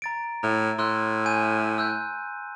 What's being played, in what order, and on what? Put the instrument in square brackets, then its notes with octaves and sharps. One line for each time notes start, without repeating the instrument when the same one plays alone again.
[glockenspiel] A#5 A6 D7
[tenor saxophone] A2 [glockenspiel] A#5
[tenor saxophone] A2 [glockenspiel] C6 E6 F#6
[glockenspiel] G#5 G6 D#7
E6 F#6 G6